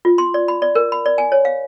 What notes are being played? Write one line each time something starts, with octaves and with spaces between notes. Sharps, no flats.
F4
C6
D5
B5
D5
A#4
B5
D5
G#5
C#5
F5